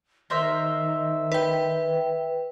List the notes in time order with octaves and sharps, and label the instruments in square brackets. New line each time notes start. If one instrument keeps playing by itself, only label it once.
[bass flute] D#3 [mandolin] A#4 C5 E5
[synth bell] B4 G5